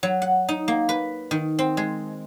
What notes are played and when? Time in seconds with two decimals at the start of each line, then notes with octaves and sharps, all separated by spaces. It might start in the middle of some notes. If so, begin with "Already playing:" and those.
0.03 F#3
0.22 F#5
0.49 D#4
0.68 A#3
0.89 B4
1.31 D#3
1.59 C4
1.77 G#3